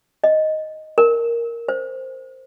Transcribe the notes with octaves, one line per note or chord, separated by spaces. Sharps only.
D#5
A#4
C5